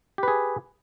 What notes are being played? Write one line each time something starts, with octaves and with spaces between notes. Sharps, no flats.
G4 G#4 B4